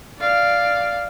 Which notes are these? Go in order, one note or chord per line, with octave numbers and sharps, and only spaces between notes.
D5 F5